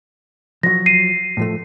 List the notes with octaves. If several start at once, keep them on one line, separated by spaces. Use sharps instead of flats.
F3 F#3 A#6
C7 D#7
A2 F3 A3